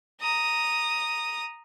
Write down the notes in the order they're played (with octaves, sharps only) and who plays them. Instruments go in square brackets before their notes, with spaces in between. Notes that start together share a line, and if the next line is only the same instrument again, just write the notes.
[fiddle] A#5 D#6